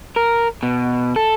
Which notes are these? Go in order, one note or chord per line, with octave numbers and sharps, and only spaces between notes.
A#4
B2
A4